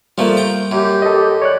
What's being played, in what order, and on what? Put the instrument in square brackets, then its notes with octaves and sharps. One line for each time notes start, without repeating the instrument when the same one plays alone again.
[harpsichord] F3 A3 [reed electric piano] G3 A#3
[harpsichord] G5 A#5
[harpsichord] F#2 [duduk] G4
[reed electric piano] A4 D#5
C#5 D5 F#6